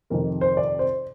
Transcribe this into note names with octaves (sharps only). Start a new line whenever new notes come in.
F2 C3 D#3 A#4
C5
D5
C5